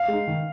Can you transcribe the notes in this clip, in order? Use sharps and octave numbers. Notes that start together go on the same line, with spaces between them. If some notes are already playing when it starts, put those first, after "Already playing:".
Already playing: F5
G#3 D#4
D#3